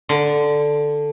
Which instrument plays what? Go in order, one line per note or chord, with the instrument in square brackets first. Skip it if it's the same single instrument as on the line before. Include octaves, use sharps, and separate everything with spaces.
[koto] D3